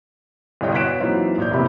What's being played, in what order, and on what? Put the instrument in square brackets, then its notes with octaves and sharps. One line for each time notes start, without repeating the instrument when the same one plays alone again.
[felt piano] G1 C2 G3 C#5 D#5 G5
B2 C#5 F#6 B6 D7 E7
E3 F#3 A#3 C4 D#4 F4
A#1 C#5 G6
F1 C3 E3 A#3 G4 B5